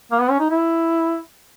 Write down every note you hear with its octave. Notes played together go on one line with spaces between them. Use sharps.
A#3
B3
C#4
D#4
E4